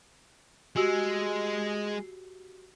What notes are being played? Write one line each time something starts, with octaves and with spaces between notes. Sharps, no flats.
G#3 F#4 G4 E6